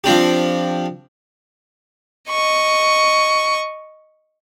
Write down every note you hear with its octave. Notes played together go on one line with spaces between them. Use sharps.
F3 C4 D4 G4
D#5 C#6